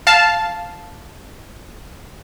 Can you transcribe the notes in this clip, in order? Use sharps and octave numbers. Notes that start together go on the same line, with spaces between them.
F5 A5